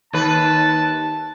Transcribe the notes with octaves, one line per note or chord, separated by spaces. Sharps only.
D#2 B4 A5